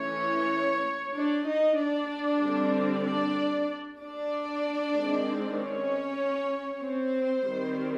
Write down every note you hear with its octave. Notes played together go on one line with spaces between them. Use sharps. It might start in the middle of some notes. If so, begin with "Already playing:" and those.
Already playing: E3 A3 C#4 C#5
D4 D5
D#4 D#5
D4 D5
D3 G3 C4
D4 D5
D4 D5
D#3 G#3 C4
C#4 C#5
C4 C5
D#3 G3 C4